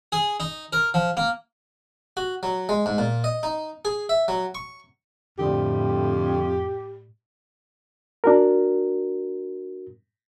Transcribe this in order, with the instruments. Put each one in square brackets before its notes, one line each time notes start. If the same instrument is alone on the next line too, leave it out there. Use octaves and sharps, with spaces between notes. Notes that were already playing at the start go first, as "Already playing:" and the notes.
[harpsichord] G#4
D#4
A#4
F3
A#3
F#4
F#3
G#3
G#2
A#2
D#5
D#4
G#4
E5
F#3
C#6
[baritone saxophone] F2 [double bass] A2 [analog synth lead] D3 [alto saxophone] G4
[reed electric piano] D4 F#4 A#4